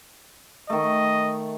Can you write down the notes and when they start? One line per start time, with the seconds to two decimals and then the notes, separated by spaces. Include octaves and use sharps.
0.70 D#3 A3 D#5